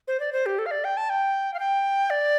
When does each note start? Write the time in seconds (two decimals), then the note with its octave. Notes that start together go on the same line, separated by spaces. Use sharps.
0.08 C5
0.20 D5
0.33 C5
0.46 G4
0.59 A4
0.66 F5
0.71 D5
0.84 G5
0.97 A5
1.10 G5
1.54 F5
1.59 G5
2.10 D5